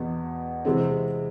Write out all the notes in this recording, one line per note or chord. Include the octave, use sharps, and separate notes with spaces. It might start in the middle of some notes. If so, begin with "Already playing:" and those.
Already playing: E2 B2 B3
C3 E3 G#3 C4